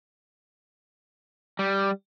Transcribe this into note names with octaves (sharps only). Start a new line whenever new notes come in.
G3